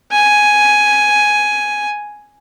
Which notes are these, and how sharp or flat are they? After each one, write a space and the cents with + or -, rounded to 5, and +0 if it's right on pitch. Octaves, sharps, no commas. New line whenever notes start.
G#5 +5